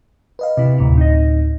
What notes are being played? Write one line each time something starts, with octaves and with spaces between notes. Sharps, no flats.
B4 D#5 F5
C3 E4
D2 A2 C4
D#4 D#5